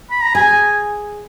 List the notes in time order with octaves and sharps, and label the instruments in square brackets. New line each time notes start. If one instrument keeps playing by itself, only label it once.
[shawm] B5
A#5
[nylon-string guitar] G#4 [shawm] G#5